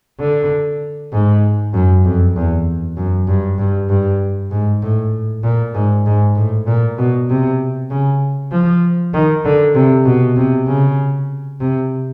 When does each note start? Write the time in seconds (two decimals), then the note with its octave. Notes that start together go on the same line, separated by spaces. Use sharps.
0.20 D3
1.12 G#2
1.74 F#2
2.05 F2
2.36 E2
2.97 F#2
3.28 G2
3.58 G2
3.90 G2
4.51 G#2
4.82 A2
5.43 A#2
5.74 G#2
6.06 G#2
6.36 A2
6.67 A#2
6.98 B2
7.29 C3
7.90 C#3
8.52 F3
9.14 D#3
9.45 D3
9.75 C3
10.06 B2
10.36 C3
10.67 C#3
11.60 C3